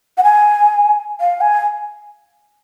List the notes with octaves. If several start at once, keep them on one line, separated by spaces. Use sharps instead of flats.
F#5
G#5
F5
G#5